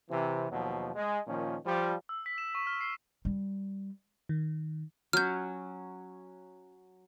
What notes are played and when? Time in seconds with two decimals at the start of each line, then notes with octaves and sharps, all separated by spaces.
0.11 C3 E3
0.51 D#2 B2 F3 F#3
0.95 G#3
1.26 A#2 D#3 F3 C#4
1.66 F3 G3
2.09 E6
2.26 B6
2.38 E7
2.55 C#6
2.67 F6
2.81 C7
3.25 G3
4.29 D#3
5.13 F#3 C#4 F6 G6